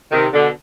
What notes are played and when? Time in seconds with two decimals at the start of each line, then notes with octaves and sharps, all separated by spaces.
0.12 C3 D#3
0.33 B2 D3